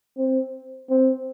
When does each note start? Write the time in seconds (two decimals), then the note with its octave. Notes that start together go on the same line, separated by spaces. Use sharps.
0.18 C4
0.90 C4